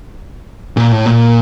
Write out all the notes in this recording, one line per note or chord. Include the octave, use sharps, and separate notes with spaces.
A#2
A2
A#2